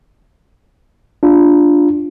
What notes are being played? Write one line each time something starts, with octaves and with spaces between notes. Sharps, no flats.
D4 F4